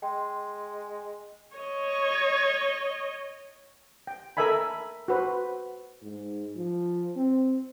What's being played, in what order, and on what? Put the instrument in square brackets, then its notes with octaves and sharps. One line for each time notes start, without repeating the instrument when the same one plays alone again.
[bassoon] G#3 [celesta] G5 C6
[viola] C#5 D#5
[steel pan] G5
A4 A#4 D#5 E5 G#5 B5
F#4 B4 C5
[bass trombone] G#2
F3
C4